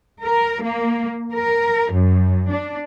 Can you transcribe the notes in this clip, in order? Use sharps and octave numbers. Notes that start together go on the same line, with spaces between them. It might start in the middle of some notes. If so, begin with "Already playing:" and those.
A#4
A#3
A#4
F#2
D4